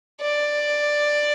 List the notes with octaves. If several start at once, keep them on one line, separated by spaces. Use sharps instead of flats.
D5